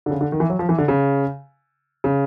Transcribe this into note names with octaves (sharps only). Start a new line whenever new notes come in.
D3
C#3
D3
D#3
E3
F#3
F3
E3
D3
C#3
C#3